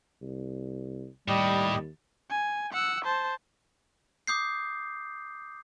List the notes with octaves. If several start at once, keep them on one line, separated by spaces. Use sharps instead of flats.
C2
D#2 A2 G3 G4 D#5
G#5
F#5 E6
C5 A5
D6 D#6 G6 C7